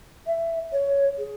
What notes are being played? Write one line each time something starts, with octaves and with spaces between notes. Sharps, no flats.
E5
C#5
G#4